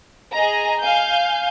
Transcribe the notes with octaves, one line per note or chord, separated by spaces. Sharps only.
G#4 D#5 A#5
F5 G#5 G6